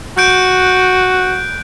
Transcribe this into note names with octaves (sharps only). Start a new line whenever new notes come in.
F#4 F#6 G6 D7